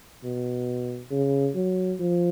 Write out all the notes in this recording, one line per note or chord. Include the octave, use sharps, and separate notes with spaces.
B2
C#3
F#3
F3